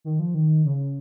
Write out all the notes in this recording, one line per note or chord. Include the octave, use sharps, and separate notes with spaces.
D#3
F3
D#3
C#3